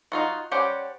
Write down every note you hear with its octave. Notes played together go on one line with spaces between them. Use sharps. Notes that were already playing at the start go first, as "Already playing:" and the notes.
D#4 F4 F#4
G3 C#4 G4 C5 F#5